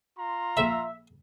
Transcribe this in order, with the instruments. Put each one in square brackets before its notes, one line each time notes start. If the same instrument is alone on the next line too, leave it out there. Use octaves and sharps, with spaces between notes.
[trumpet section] F4 A#5 C6
[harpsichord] A#1 B5 [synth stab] E5